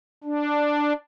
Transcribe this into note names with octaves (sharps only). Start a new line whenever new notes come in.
D4